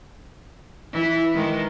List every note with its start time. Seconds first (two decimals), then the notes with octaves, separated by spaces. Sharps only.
0.93 E3 E4
1.34 D#3 G#3